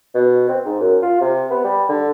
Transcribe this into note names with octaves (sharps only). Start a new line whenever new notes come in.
B2
C4
G#2
F#2
F4
C3
B3
G3
D3